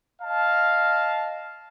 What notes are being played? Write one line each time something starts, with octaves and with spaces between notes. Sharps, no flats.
D#5 F5 A5